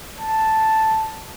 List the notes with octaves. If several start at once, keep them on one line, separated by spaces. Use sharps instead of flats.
A5